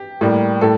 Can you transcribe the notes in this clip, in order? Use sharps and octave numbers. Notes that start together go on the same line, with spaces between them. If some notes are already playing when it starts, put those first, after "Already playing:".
Already playing: G4
A2 G3 A#3
A2 A4